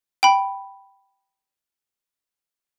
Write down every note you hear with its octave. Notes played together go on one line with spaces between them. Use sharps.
G5 B5